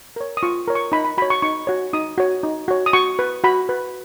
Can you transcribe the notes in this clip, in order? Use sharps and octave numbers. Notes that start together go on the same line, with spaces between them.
A#4 C#5
D#6
F4 C#6
A#4 C#5
C#6
D#4 B5
B5
F#4 C#5 B5
C#6
D#4 C#6
F#4 C#5
D#4 D#6
F#4 C#5
D#4
F#4 C#5
D#6
F#4 C#6
B4
F#4 B5
B4